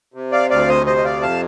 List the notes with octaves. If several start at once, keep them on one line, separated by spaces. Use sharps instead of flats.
C3
D5 F5
D2 D5 F5
C5 D#5
C3 C5 D#5
D#5
D5 F5
F2 F5 A5